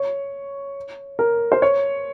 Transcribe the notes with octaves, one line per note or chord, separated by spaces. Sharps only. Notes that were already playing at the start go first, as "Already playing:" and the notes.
Already playing: C#5
A#4
C5
C#5